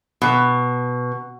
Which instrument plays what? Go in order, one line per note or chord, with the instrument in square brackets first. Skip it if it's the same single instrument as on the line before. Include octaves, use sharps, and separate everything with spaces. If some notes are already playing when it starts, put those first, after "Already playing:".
[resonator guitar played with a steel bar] B2